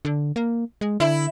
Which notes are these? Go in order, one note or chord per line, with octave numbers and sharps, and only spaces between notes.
D3
A#3
G#3
D3 E4